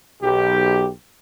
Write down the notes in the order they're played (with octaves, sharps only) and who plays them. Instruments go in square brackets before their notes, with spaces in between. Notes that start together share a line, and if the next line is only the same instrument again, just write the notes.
[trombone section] B1 G4